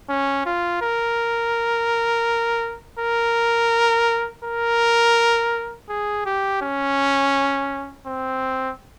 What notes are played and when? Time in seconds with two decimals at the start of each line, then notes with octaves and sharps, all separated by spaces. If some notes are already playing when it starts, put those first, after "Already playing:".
0.09 C#4
0.46 F4
0.82 A#4
2.99 A#4
4.44 A#4
5.89 G#4
6.25 G4
6.62 C#4
8.07 C4